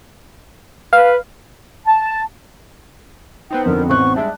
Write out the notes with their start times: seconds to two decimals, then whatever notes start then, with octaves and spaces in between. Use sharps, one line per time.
0.93 B4 F5
1.86 A5
3.51 B3 C4 D#4 G5
3.66 F2 D3 A#4
3.89 A1 C5 C#6 F#6
4.16 G3 G#3 D4 E5 A5